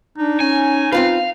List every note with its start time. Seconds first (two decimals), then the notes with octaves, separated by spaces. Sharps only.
0.18 D4 D#4
0.40 C#4 G#5
0.92 C4 F4 B4 F5